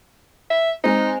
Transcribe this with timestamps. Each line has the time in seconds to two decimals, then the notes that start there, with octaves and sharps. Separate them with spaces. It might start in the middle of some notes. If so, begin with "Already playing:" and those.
0.50 E5
0.84 G#3 C4 D#4